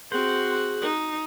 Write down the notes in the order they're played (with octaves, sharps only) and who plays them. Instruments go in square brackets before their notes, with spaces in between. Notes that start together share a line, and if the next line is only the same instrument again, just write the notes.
[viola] C4 [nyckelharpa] F#4 F#5 [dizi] G#4 [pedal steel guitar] C5
[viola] D#4